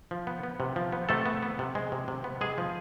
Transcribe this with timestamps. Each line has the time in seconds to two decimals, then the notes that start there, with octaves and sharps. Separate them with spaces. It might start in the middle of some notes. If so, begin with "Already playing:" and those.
0.11 F3
0.27 B3
0.43 B3
0.60 C3
0.76 F3
0.92 B3
1.09 C3 A3 A4
1.26 B3
1.43 B3
1.59 C3
1.75 G#3
1.92 C3
2.08 C3
2.24 B3
2.41 C3 G#3 G#4
2.58 F3